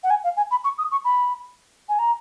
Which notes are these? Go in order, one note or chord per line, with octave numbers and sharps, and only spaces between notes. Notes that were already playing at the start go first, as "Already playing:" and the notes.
F#5
G#5
F5
G#5
B5
C#6
D#6
C#6
B5
G#5
A#5